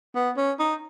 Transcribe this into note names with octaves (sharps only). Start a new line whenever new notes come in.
B3
C#4
D#4